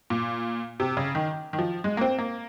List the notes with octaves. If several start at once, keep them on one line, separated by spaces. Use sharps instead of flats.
A#2
C3
C#3
D#3
D#3
F3
G#3
A#3
C4
A#3